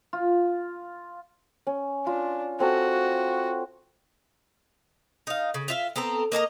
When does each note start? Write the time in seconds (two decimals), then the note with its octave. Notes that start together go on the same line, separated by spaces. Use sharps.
0.13 F4
1.67 C#4
2.07 D4 F4
2.60 C4 F#4 A4 C#5
5.27 D#4 F5
5.54 C#3
5.68 F4 E5 F5
5.96 B3 C4 A4 A#5
6.32 A#3 D#5 A5 A#5